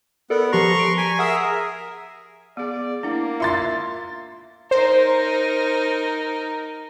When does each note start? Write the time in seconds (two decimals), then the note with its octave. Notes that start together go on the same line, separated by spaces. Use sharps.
0.30 B3 A4 A#4 D5
0.52 F3 G4 A#5 C6 C#6 A#6
0.79 D7
0.98 G#5 B6
1.19 G#4 A#4 E5 F#5
2.57 B3 G#4 D5
3.03 A#3 D4 E4 F#5
3.40 F4 E5 C6 A6
4.71 D#4 A#4 C5